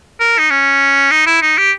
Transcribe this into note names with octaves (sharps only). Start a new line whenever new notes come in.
A#4
D#4
C#4
D#4
E4
D#4
G4